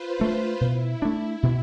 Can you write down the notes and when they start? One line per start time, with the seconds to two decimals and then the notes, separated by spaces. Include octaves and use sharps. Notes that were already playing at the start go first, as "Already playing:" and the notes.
Already playing: F4 B4 C5
0.20 A3 D4
0.61 B2 E4
1.02 A3 D4
1.43 B2